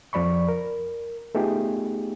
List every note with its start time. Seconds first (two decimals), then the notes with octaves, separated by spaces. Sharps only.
0.13 F2 F3 D5 B5 C#6
0.49 A#4
1.35 A3 B3 D#4 F4 G4 G#4